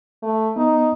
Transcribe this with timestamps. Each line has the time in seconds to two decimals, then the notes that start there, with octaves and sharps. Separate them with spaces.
0.23 A3
0.56 B3 D#4